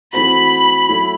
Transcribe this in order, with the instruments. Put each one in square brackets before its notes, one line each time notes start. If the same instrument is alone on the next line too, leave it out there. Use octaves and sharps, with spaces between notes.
[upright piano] E3 A3 C4 F#4 [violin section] B5
[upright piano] F#3 A3 E4